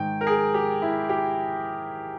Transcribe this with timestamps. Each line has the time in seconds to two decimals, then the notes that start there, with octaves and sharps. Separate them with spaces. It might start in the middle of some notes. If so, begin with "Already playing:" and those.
Already playing: G#2 D#3 G5
0.21 A#4
0.27 G#4
0.54 G4
0.82 E4
1.10 G4